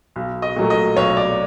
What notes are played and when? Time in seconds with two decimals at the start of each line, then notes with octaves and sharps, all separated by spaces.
0.16 B1
0.42 D#5
0.56 A#2 F#3 A3
0.70 D#5
0.97 B1 C#5
1.17 D5